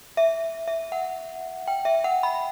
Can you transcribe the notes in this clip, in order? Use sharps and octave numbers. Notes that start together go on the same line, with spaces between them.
E5
E5
F#5
G5
E5
F#5
B5